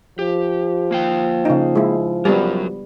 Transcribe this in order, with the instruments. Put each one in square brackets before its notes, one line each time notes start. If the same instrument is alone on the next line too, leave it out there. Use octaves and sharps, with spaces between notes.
[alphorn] F3 [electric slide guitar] G4
[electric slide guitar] A#3 F5 G5
[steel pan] C#3 D#4
G#3 E4
[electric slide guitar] F#3 A#4 [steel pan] G3 B3